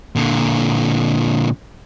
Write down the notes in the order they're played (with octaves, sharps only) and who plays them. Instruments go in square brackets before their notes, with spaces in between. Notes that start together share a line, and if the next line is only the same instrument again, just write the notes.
[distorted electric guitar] A#2 D3